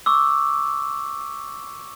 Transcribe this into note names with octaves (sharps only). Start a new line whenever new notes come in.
C#6 D6 E6